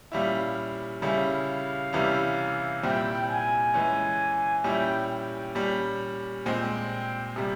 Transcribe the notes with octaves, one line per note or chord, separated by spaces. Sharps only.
A#2 G3 C#4 E4 F5
C#3 G3 C#4 E4 F5
C3 E3 G3 C#4
A#2 G3 C4 E4 G5
G#5
E3 G#3 C#4
A#2 G3 C#4 E4 G5
G5
A#2 G3 C#4
A#2 G#3 C4 G5
C3 G3